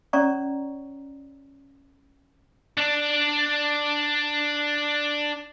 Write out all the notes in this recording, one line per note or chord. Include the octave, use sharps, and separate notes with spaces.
C#4 C#5 D5 A#5 C#6
D4 D5